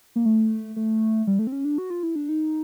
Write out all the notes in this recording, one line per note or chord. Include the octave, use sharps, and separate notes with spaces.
A#3
A3
A3
G3
A3
C4
C#4
D4
F#4
F4
E4
D4
D#4